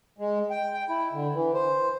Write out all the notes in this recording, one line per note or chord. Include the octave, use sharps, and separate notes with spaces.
G#3
G5
G5
E4
D3
E3
C5